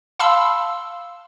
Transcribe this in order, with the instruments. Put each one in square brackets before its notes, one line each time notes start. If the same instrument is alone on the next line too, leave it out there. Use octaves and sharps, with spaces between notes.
[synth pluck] F5 A5 B5 C6 E6